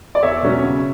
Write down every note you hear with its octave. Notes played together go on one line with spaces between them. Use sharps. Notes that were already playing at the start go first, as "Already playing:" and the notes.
D5
E2 C#5 E5
B2 F#3 C#4
C#3